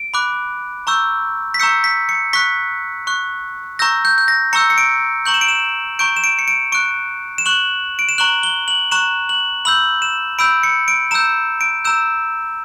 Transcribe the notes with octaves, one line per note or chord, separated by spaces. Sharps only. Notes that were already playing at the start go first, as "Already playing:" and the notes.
Already playing: D7
B5 D6 F#6
A#5 C#6 E6 G6
B6
A#5 C#6 E6 G6 C#7
B6
C#7
C#6 F#6 B6
C#6 F#6
A#5 C#6 E6 G6 A#6
G6
G6
A#6
A#5 C#6 E6 G6 C#7
C#7
D7
A#5 C#6 G6 F#7
E7
D7
E7
A#5 C#6 G6 D7
E7
D7
C#7
D7
C#6 F#6 D7
E7
C#6 F#6 F#7
D7
E7
A#5 C#6 F#6 F#7
G7
F#7
A#5 C#6 F#6 E7
F#7
B5 E6 G6 F#7
E7
B5 E6 G6 D7
C#7
D7
A#5 E6 G6 E7
D7
A#5 E6 G6 E7